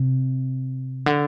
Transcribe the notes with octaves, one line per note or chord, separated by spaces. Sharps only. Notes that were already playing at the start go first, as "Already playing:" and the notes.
Already playing: C3
D3